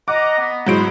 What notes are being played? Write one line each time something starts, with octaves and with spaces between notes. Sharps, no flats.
D#5 F#5 A#5 D6
B3
G#2 C#3 F#3 E4 C5 D7